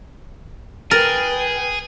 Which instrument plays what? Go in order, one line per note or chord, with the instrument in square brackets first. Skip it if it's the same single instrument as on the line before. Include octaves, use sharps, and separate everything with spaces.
[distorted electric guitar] G#4 [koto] A#4 [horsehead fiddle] B4 G5 [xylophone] A6